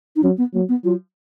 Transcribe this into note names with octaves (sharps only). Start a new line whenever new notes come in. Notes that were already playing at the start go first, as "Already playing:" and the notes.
D#4
F#3 C#4
B3
F#3 A#3
B3
F#3 F4